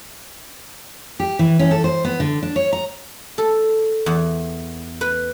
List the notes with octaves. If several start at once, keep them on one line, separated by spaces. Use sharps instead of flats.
G4
E3
C#4
A4
C5
B3
D3
D4
C#5
A#5
A4
E2
B4